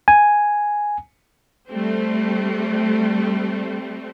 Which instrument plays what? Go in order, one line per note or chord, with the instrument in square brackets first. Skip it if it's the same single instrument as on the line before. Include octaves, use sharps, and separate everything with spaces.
[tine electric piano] G#5
[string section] G3 A3 C4